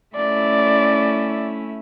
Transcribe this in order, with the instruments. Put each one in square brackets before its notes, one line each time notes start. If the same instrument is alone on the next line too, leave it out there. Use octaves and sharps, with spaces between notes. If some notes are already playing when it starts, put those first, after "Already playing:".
[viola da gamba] A3 C#4 E4 [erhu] D5